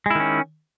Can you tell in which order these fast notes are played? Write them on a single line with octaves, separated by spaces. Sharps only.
G#3 E4 D#3 C#4